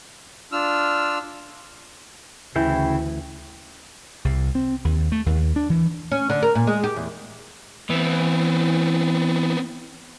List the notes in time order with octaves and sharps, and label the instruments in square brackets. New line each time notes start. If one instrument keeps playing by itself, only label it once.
[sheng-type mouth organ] D4 F4 E6 F6
[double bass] D2 [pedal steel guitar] C#3 E4 G5 [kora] E3
[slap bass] C2
C4
D#2
A3
D#2
D4
E3
[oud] C#4
D3
A#4
A#2
G#3
G4
E2
[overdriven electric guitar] E3 [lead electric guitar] B3 C4